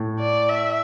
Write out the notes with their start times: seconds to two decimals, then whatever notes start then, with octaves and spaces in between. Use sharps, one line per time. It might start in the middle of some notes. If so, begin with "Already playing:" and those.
Already playing: A2
0.19 D5
0.49 E5